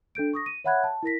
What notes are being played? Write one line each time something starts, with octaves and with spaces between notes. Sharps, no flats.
D4 A4 G6 D7
C#6 D#6 A#6
D#7
C#5 E5 F#5 B5 F#6 G#6
A5
E4 A#4 A#6 B6